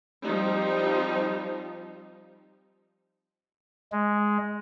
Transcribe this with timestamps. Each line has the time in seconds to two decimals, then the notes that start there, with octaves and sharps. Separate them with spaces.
0.23 F3 G3 C4 D#4
3.92 G#3